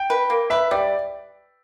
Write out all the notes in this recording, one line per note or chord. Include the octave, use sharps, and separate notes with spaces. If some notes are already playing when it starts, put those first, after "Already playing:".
Already playing: G5
B4
A#3
B4 E5
G3 D5